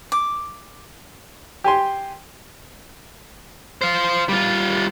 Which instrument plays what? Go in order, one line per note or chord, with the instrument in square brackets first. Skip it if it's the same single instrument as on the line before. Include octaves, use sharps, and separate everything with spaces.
[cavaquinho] D6
[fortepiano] G4 G#5 C6
[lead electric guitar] C5 F5
G3 F4